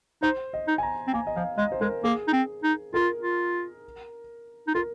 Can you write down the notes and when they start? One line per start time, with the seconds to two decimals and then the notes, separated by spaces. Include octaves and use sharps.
0.23 D#4 C5
0.53 D#5
0.68 D#4
0.78 G#5
0.83 A#5
1.07 C4
1.14 A#3 G#5
1.27 D#5
1.36 F3 F5
1.58 G#3 D#5
1.72 C5
1.81 G#3 A#4
2.04 A#3 G#4
2.28 D#4
2.33 C4
2.64 D#4
2.94 F4 A#4
3.21 F4
4.68 D#4
4.75 F4 A#4